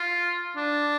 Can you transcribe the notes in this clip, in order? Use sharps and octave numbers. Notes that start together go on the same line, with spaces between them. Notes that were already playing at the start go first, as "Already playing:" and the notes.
Already playing: F4
D4